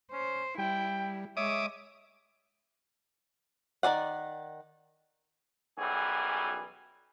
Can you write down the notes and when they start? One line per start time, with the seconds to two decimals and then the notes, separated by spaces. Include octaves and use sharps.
0.12 C#4 C5
0.58 G3 E4 G5
1.37 G#3 C#5 E5 D6 D#6
3.83 D#3 F3 D5 F#5
5.78 B1 F#2 E3 G3 G#4